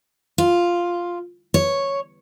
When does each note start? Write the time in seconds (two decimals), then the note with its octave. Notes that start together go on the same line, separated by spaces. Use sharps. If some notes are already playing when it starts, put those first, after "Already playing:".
0.38 F4
1.54 C#5